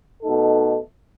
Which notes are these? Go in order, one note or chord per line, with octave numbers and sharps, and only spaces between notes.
B2 A3 D#4 A4